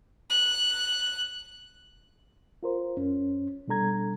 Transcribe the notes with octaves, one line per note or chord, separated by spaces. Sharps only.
F#6
F4 A#4 C5
F#2 C#4
B2 G3 D4 A4 A#5 G#6